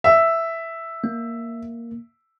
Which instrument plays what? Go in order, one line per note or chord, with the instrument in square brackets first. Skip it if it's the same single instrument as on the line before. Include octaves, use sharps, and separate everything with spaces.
[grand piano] E5
[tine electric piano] A#3